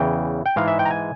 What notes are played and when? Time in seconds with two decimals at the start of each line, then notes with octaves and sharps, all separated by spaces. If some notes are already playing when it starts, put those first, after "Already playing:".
Already playing: E2 C#3 E3 G5
0.46 G5
0.56 G#2 E3 G#3 F5
0.68 E5
0.79 G5
0.86 A#5
0.91 G#5